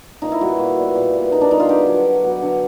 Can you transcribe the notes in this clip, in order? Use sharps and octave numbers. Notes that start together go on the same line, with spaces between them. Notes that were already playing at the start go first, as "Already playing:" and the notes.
A#2 D#4
E4
G3 B3 F#4
A#2
G3 B3
A#2
G3 B3
A#2 D#4
D4
G3 B3 D#4
F4
D3 G4
F#3 B3
D3
F#3 B3
D3